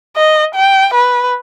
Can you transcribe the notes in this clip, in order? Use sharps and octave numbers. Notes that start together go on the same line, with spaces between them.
D#5
G5
B4